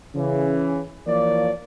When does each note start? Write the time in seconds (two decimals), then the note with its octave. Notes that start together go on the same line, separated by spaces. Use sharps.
0.15 C#3 E3
1.06 E3 F3 A#3 C#5 D5